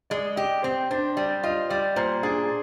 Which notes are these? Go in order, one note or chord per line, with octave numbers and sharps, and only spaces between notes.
G#3 D5
G4 D#5
C4 C5
D4 C5
G3 D5
F4 D#5
G3 D5
A#2 C5
D4 G#4